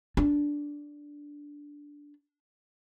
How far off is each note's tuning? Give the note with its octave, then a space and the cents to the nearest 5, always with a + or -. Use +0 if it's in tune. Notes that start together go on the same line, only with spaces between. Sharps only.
D4 -10